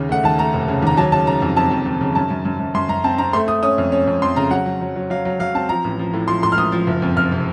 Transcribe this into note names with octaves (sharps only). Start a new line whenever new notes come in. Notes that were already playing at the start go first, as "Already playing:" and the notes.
Already playing: D#2 C#3
A3 F#5
D#2 A5
A3 A#5
F1
C#3
D#2 A#5
F#3 A5
C#3 A5
C#3 A#5
F2
F2 A5
F2
F2
C#3
F#2 A5
F#2
F#2
F#2
F#2 C6
F#2 A#5
C4 A5
C4 A#5
A3 C6
A3 D#6
C#4 D#6
F2
C#4
F2
F2 C6
C#3 A#5
F#3 F#5
F#3
F#3
F#3
F#3 F5
F#3
F#3 F5
C4 A5
F3 A#5
A1
F3
A2
F3 C6
A2 C6
F6
A1 D#6
F3
F#1
F2
F#1 F6
C3